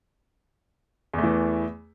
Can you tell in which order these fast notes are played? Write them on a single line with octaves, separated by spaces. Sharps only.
E2 A3 E3